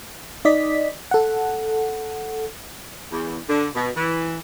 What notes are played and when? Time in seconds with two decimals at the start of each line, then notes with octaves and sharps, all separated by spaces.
0.45 D#4 D5 D#5 B6
1.11 A4 F#5
3.11 E2
3.48 D3
3.75 B2
3.96 E3